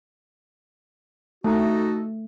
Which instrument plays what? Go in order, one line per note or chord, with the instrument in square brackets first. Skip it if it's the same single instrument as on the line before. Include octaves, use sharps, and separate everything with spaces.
[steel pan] A3 [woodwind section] D#4 F#4 A4